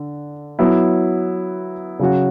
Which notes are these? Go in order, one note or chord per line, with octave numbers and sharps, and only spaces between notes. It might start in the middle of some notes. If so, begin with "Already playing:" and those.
Already playing: D3
F#3 B3 E4
C#3 F#3 C#4 F#4